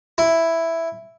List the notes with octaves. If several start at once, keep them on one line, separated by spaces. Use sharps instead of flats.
E4